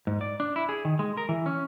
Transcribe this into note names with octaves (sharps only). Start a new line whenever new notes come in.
G#2
D5
D4
E4
G#4
D#3
G#3
A#4
E3
C#4